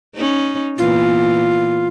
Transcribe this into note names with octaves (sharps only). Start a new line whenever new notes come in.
C#4 D#4
A#2 E3 B3 F4